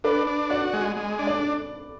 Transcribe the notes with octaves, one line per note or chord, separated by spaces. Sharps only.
D4 B4
D4
F#4 D5
G#3
G#3
D4
D5